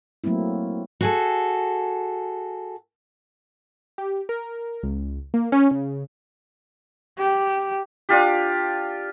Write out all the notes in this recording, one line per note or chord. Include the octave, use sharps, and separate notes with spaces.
F#3 A3 A#3 C4 E4
F#4 G#4 A4
G4
A#4
C#2
A#3
C#4
C#3
G4
D4 F4 G4